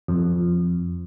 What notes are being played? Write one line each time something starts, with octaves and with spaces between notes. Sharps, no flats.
F2